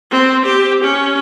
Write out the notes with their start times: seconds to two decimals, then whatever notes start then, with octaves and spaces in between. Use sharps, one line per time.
0.11 C4
0.46 G4
0.84 C#4